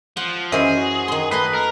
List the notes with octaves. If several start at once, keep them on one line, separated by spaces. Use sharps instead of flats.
F3 F#5
F#2 E3 G#4 C5 D#5 E5
F#4
D#3 C6
A3 D#4 B4 D#5 G#5 F#6 B6 C7
A#4